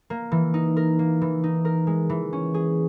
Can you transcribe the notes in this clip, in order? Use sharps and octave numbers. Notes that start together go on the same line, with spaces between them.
A#3
E3
D#4
A#4
A#3
E3
D#4
A#4
G#3
E3
C#4
G#4